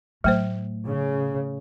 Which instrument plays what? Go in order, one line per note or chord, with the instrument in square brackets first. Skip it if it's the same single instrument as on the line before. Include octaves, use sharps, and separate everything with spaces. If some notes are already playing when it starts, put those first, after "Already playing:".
[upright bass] A2 [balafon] F#3 A3 C5
[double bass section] C#3